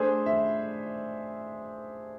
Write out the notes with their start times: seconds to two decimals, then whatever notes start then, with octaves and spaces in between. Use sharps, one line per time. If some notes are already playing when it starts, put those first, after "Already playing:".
Already playing: A3 D4 G#4 C5
0.26 E5